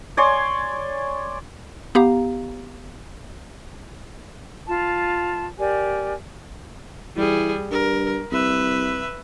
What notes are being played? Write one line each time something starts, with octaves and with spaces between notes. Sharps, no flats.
C#5 D5 G#5 C6
B3 G4 F5 A#5
F4 A5
G4 A#4 D5 G#5
E3 G3 G#4
G2 A#4
C2 B4 E5